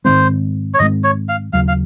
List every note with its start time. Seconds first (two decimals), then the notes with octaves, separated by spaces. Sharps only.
0.05 G#2 D#3 G#3 C4 C5
0.74 C#5
0.79 G#2 D#3 G#3 C4 D#5
1.04 C#5
1.29 F5
1.53 D#2 C#3 F#3 F5
1.68 F5